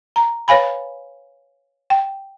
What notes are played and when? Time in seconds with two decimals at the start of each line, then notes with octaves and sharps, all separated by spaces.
0.16 A#5
0.48 B4 C#5 F5 G#5 B5
1.90 G5